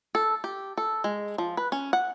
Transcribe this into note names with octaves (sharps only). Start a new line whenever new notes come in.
A4
G4
A4
G#3
F3
B4
C#4
F#5